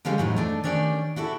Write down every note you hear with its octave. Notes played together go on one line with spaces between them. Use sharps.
D3 G3 G#3 C#4 G4 F5
D#2 A2 F#3 D#4
A3 D4 D#4
D#3 C#4 D4 G4 D5
E4 F#4 G4 A4